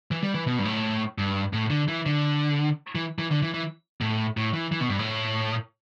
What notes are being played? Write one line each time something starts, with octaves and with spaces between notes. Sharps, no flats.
E3
G3
E3
B2
G2
A2
G2
A2
D3
E3
D3
E3
E3
D3
E3
E3
A2
A2
E3
E3
B2
G2
A2